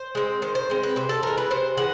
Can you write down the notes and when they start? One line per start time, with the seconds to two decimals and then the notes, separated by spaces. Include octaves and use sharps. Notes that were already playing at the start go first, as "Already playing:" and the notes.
Already playing: C5
0.15 G#3 C4
0.42 D#3 C5
0.55 C5
0.70 G#3 C4
0.83 B4
0.96 C3 C5
1.09 A4
1.23 E3 G#3 A#4
1.38 B4
1.51 C3 C5
1.77 E3 G#3 F#5